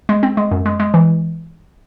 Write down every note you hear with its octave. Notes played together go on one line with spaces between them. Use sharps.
G#3
C4
G#3
F#2
G#3
G#3
E3